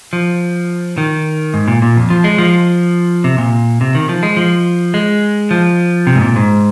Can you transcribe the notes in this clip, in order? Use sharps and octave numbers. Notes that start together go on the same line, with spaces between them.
F3
D#3
G#2
A#2
A#2
F2
F3
G#3
F3
C3
A#2
C3
D#3
F3
G#3
F3
G#3
F3
C3
G#2
A#2
G#2